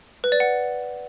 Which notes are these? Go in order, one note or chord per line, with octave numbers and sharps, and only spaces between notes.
B4
D5
F#5